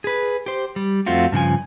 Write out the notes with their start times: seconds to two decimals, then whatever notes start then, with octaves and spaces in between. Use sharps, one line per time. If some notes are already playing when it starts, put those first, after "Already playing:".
0.04 G#4 B4
0.46 G4 C5
0.76 G3
1.06 F2 A3 C4 F4 F#4
1.32 G2 C#3 F3 G#5